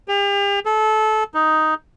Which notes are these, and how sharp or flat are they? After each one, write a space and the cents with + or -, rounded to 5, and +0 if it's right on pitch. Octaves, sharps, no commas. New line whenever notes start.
G4 +40
A4 -25
D#4 +5